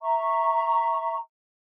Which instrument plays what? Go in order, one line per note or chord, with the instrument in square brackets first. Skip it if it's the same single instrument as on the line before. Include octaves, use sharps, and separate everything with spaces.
[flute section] E5 A#5 C#6